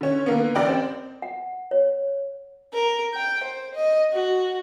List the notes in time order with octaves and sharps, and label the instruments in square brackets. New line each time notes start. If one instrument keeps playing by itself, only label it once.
[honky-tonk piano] D3 C#4
D3 A#3 B3
A1 D5 G5
C4
[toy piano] F#5
C#5
[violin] A#4
G5
C5
D#5
F#4